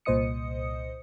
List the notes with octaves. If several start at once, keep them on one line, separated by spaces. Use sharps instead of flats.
C2 A#2 C5 D#5 D#6 C#7